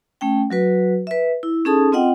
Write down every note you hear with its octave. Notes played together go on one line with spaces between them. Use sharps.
A3 C#4 G5
F#3 F#4 B4
B4 E5
E4
C#4 D#4 G#4 A4 A5 D#6
C4 F4 D#5 F#5 G5